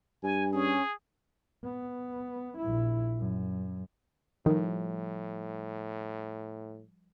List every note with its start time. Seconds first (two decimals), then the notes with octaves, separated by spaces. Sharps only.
0.23 G2 G#5
0.53 C#4 G#4
1.64 B3
2.58 A#1 E4
3.18 F#2
4.46 A2 D#3 F3 G3